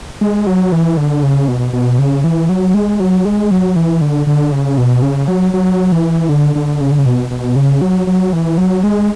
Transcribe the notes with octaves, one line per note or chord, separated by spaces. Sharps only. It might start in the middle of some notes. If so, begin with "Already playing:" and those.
G#3
F#3
E3
D3
C#3
B2
B2
C#3
E3
F#3
G#3
F#3
G#3
F#3
E3
D3
D3
C#3
B2
C#3
F#3
F#3
E3
D3
D3
C#3
D3
C#3
B2
B2
C#3
F#3
F#3
E3
F#3
G#3